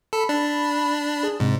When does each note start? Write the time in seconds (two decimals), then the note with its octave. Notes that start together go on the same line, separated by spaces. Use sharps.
0.13 A4 B5
0.29 D4
1.23 G#4
1.40 G#2 C3